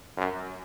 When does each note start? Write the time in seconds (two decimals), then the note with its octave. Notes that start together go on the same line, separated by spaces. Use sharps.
0.17 F#2